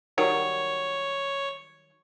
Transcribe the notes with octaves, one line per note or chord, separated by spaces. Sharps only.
D#3 F#3 G3 C#5